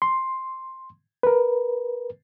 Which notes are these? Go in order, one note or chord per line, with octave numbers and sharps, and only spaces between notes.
C6
A#4 B4